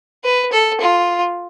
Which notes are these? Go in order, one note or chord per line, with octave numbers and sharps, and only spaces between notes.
B4
A4
F4